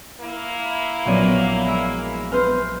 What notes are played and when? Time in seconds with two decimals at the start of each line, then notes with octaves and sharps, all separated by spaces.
0.21 A#3 E4
1.05 A#1 F#3 B3 C#4 D5 D#7
1.66 G#3 E5
2.32 B4 C5 F6 G6